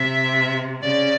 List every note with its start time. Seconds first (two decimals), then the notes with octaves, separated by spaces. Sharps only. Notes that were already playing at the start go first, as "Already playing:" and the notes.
Already playing: C3 E5
0.81 C#3 D5